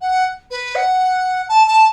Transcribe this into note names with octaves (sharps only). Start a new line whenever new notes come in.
F#5
B4
F#5
A5
A5